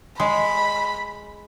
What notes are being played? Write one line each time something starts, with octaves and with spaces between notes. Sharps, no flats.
G#3 B5